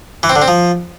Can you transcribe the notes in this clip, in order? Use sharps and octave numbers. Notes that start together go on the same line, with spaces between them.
E3
C4
D3
C4
F3